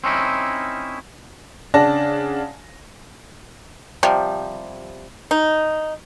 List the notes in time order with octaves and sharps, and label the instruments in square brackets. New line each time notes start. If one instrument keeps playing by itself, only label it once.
[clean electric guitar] C4 C#4 D#4 E4
[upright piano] C#3 D4 D5 F#5 A5 A#6
[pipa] C3 F3 G3
D#4